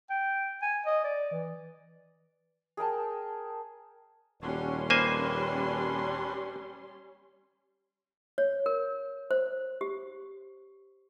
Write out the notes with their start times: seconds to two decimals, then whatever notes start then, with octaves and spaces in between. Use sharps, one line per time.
0.10 G5
0.62 G#5
0.86 D#5
1.04 D5
1.32 E3
2.77 G#4 A#4 G5 A5
4.42 D#1 G3 C#4 D4 F#4 C#5 C6
4.90 A#3 C4 D4 B4 C5 G#5
8.38 C#5
8.66 A#4
9.31 C5
9.81 G4